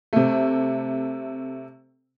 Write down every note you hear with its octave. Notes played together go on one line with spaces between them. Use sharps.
C3 A3